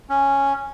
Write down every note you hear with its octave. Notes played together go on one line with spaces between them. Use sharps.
C#4